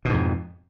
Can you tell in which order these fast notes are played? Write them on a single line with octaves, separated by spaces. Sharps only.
B2 G#2 F2